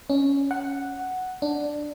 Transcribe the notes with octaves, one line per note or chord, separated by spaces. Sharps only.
C#4
F#5
D4